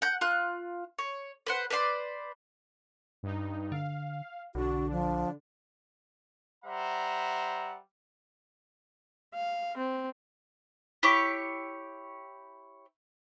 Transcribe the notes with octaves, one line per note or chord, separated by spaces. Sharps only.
F#5 G6
F4 F#6
C#5
B4 C5 F#5
B4 C5 D5 C6
G2 D#4
D3 F5
B1 D3 D4 F#4
F3
G3 C5 E5 F#5 A#5
F5
C4
E4 G4 C#5 D6